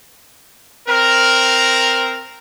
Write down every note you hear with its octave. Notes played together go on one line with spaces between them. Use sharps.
C4 A#4